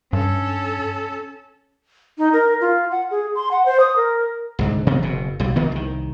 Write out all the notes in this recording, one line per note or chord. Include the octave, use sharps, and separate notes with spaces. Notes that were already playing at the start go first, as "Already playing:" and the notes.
G2 C#4 A4
D#4
A#4
F4
F#5
G#4
C6
F#5
C5
D#6
A#4
C2 G#2 D3
C3 E3 B3
F#1 B2
B1 G3
D2 D#3 A#3 B3
C2 D#3